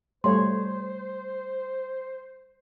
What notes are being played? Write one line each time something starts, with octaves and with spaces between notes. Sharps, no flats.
G3 A3 C5 C#5 C6